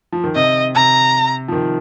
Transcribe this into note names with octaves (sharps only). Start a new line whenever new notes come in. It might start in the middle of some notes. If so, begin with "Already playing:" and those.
F3
D#3
C3 D#5
C3 A#5
F3
D#3